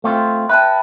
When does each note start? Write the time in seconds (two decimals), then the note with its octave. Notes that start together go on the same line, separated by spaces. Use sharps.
0.04 A3 C4 F4
0.49 B4 E5 G5 A5